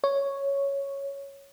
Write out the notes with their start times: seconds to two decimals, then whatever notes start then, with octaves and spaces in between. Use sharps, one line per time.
0.04 C#5